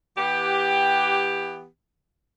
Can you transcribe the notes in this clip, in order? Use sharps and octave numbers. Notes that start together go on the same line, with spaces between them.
E3 B3 G4